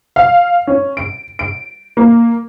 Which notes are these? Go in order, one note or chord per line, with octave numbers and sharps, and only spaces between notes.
F5
C#4
D7
D7
A#3